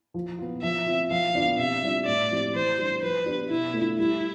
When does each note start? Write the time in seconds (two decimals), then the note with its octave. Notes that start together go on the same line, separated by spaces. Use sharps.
0.14 F3
0.39 B3 F4
0.63 F3 E5
0.86 C4 F4
1.11 F3 F5
1.35 B3 D4 F4
1.58 C3 E5
1.82 G3 D4 F4
2.06 A2 D5
2.31 F3 C4 E4 G4
2.54 E3 C5
2.78 G3 D4 G4
3.02 F3 B4
3.26 B3 D4 G4
3.50 B2 E4
3.74 A3 D4 F4
3.98 G3 E4